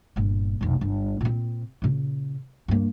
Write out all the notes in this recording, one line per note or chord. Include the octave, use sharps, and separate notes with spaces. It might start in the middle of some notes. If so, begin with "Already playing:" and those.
G1 A#2
F1 B1
G1
A#2 C4
A#2 C#3
G2 A#3